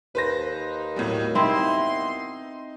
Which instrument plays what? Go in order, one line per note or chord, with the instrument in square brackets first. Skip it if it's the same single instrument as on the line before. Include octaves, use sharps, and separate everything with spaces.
[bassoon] D#2 [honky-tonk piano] B4 C5 A#6
[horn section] D#4
[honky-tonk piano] A2 F#3 G3
[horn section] B2 B3 C6 [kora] C4 E4 [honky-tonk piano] D#4